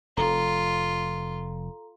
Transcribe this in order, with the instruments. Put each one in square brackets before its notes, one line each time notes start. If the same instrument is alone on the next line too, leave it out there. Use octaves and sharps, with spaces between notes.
[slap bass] F1 [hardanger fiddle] F4 [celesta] A4 A#5